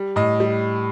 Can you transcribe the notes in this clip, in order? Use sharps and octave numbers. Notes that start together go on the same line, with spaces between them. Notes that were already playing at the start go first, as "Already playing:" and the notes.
Already playing: G3
A2 D#5
G3